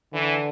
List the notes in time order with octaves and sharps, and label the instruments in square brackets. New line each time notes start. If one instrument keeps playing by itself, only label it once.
[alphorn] D3 [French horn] E3